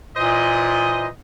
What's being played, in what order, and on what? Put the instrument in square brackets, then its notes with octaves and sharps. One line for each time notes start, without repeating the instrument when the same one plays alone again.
[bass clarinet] A#2 [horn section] E3 C5 D#5